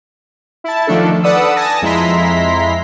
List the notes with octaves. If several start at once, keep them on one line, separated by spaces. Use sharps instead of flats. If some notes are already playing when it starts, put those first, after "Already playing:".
E4 A5
D#3 F3 A3 D4 A4
A4 B4 D5 F#5 D#6 E6
G#5 A5 D#6 A#6
F2 G#3 E4 A#5 C6 B6